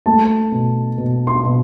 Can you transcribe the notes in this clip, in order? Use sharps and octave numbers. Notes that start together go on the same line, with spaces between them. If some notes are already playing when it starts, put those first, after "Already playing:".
A3 A5
B2
B2
C6
B2